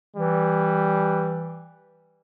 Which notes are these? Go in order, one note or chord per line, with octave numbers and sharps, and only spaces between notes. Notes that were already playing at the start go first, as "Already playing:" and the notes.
E3 G3